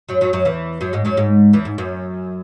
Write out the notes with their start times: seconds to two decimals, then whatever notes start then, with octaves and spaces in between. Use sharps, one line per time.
0.09 F#2 F#3
0.21 F#2 F#3
0.33 F#2 F#3
0.45 E2 E3
0.81 F#2 F#3
0.93 G#2 G#3
1.05 F#2 F#3
1.17 G#2 G#3
1.53 E2 E3
1.65 G#2
1.78 F#2